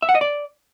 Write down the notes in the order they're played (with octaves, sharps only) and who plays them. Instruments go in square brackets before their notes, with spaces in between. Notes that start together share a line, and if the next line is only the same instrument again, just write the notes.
[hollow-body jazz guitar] E5
F#5
D#5
D5